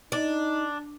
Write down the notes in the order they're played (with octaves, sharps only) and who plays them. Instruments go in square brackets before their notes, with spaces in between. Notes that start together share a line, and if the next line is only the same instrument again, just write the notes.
[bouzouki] D4 [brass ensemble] D#4